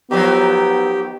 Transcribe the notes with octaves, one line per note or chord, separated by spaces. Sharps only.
D#3 F3 F#3 B3 G4